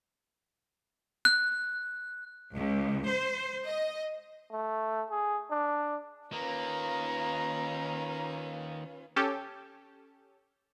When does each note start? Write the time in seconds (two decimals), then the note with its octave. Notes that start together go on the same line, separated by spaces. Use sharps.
1.25 F#6
2.54 C#2
3.05 C5
3.65 D#5
4.51 A3
5.10 G#4
5.51 D4
6.32 D#3 A#3 C#4 F4 B4 A#5
9.16 C#4 G4 A4